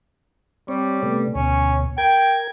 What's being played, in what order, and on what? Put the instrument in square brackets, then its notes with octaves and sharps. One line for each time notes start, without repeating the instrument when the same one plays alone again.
[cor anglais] G3 [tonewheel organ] C4 C#5
[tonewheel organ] C3 A3 B3
[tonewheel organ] D2 B2 [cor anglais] C#4
[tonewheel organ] A#4 G#6 [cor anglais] G5